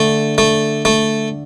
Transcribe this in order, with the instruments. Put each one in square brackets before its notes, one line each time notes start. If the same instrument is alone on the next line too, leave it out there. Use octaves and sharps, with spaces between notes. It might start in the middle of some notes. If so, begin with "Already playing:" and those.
Already playing: [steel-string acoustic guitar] D3 [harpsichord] A3
[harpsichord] A3
A3